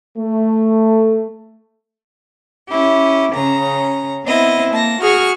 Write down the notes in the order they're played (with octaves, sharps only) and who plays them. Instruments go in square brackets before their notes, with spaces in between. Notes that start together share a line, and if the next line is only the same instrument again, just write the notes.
[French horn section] A3
[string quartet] C#4 E4 G4
C#3 C#4 A#5
B3 C4 E4 D#5
A#3 A5 A#6
F#4 G#4 C#6 F6